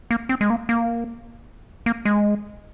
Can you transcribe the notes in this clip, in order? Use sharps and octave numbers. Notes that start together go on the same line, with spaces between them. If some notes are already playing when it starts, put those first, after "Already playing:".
A#3
C4
G#3
A#3
A#3
A#3
G#3